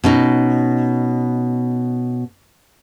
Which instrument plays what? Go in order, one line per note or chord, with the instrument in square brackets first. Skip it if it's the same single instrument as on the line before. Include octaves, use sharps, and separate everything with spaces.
[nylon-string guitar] B2 C#4 D#4